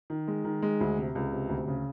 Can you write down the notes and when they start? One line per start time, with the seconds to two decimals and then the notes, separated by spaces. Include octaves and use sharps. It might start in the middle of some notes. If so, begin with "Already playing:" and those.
0.10 D#3
0.28 G#3
0.44 D#3
0.62 G#3
0.80 D2
0.98 C3
1.15 C#2
1.32 C3
1.49 D2
1.68 C#3